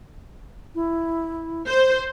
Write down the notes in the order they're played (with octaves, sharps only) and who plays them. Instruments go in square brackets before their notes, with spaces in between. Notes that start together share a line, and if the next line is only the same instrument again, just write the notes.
[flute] E4
[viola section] C5